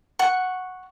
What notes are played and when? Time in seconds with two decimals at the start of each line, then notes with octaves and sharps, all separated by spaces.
0.19 F#5 C#6